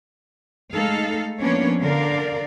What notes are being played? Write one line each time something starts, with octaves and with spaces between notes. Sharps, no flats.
G#3 A3 D#4 A4 F5
F3 A#3 B3 C#4 D4 C#5
D3 A#4 D5 F5